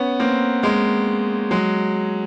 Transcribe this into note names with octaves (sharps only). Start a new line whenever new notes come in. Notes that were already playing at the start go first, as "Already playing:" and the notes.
Already playing: B3 C#4
A#3 C4
G#3 A#3
F#3 G#3